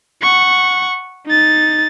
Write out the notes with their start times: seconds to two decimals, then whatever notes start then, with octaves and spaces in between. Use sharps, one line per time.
0.22 F#5 C#6
1.26 D#4 A6